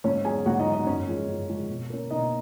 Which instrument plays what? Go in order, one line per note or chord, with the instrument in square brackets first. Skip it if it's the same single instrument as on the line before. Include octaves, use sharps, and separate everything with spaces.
[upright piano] G#2 C#4 C#5
F#3 B3 G#4 G#5
G#2 F#4 F#5
D#4 D#5
F#3 B3
D#4 D#5
F#2 C#4 C#5
F3 G#3
F#2
F3 G#3
B2
A#3 C#4
B2 D#4 D#5